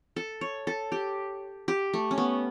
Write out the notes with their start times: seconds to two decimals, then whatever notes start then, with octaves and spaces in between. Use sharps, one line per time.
0.16 A4
0.41 C#5
0.67 A4
0.92 G4
1.68 G4
1.94 A3
2.11 C#4
2.18 B3